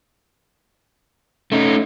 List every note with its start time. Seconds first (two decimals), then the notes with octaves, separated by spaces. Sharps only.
1.52 A3 C#4 D#4